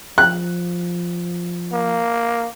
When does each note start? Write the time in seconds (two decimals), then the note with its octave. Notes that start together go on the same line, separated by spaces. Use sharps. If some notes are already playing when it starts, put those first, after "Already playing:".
0.18 F3 F#6
1.73 A#3